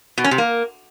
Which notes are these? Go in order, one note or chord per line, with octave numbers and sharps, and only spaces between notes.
B2
C#4
C3
A#3